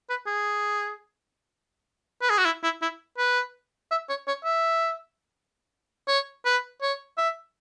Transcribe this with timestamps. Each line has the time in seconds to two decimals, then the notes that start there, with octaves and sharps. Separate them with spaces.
0.09 B4
0.26 G#4
2.22 B4
2.30 G#4
2.38 F#4
2.45 E4
2.63 E4
2.82 E4
3.18 B4
3.91 E5
4.09 C#5
4.27 C#5
4.44 E5
6.08 C#5
6.45 B4
6.82 C#5
7.18 E5